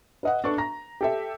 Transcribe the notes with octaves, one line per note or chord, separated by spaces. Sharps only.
B4 D#5 F#5
D4 A4 B4 C#6
A#5 A#6
G4 A4 E5